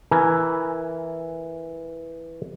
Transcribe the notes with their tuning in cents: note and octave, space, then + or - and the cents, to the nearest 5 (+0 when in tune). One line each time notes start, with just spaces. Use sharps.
E3 +0 A#4 +0 G#5 +15